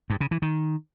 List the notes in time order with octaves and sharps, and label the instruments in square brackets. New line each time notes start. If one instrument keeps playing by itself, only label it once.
[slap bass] G2
C#3
E3
D#3